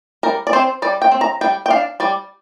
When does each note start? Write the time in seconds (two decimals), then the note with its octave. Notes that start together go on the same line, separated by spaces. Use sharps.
0.23 G3 A#4
0.47 D5
0.53 C4 C5
0.82 G3 D5
1.02 G5
1.11 C4
1.21 A#5
1.41 G3 G5
1.66 G5
1.70 D4 F5
2.00 G3 D5